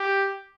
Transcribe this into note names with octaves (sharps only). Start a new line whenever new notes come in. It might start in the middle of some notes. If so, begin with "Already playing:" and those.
Already playing: G4